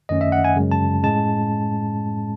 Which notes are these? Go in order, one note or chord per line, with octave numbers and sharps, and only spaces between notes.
F#2 D#3 A3 C#4 D#5
E5
F#5
G#5
F#2 C#3 G#3
A5
A2 G#3 C#4 A5